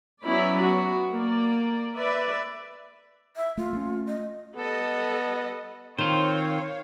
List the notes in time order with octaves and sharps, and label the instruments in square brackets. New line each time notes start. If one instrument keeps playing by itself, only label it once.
[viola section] F#3 B3 C#4 E4 D5 B5
B3 F#4
A#3 D5
B4 D5 E5
[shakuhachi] E5
[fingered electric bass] A3 [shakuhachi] F4
[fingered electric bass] A3 B3 C#4
[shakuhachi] D#5
[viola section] G3 A4 D#5 [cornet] B3
[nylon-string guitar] D#3 [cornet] C4 [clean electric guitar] F4 C5 [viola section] C#5 F5